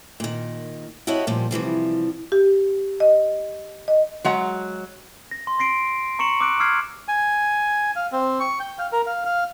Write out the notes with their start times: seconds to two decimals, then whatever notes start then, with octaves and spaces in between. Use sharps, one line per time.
0.20 A#2 D#3
1.07 E4 F#4 G4 A4 C#5 D#5
1.27 A#2 F3 G3
1.51 C3 E3 F3 G3
2.32 G4
3.00 D#5
3.88 D#5
4.24 F#3 G#3 F#5 A#5
5.31 A#6
5.47 C6
5.59 C6 A#6 C7 D7
6.19 A#5 C#6 C#7 E7 F#7
6.40 D6 E6 F#6 D7
6.60 D6 E6 F6 G#6 C7
7.08 G#5
7.96 F5
8.12 C4
8.40 C#6
8.59 G5
8.79 F5
8.93 A#4
9.07 F5
9.25 F5